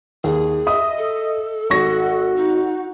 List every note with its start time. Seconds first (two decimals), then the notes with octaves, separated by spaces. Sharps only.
0.24 D#2 G#4
0.67 D#5 E5 D#6
0.98 A4
1.70 G#1 F#4 C#6 A#6
2.36 D#4